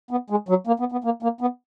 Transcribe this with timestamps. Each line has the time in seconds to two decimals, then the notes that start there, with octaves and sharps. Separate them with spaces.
0.11 B3
0.30 G#3
0.49 F#3
0.67 A#3
0.80 B3
0.92 B3
1.04 A#3
1.22 A#3
1.41 B3